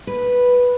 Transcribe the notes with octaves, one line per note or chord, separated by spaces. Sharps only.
B4